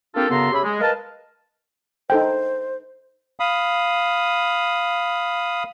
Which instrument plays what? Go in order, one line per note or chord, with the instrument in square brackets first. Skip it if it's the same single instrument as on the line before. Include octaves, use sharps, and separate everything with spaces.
[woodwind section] A#3 C4 D4 F4 G4 A4
F#2 C#3 B3 A4 A#5 C6
C#4 G4 G#4 E5 B5
G#3
A#4 B4 D#5 F5 A5
[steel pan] D#4 A4 G5 [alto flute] C5
[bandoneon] F5 B5 D#6